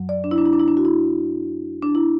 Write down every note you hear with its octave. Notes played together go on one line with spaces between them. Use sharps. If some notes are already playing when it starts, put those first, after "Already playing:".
Already playing: F#2 F#3
D5
D4
E4
D4
E4
D4
E4
D4
F#4
E4
D4
E4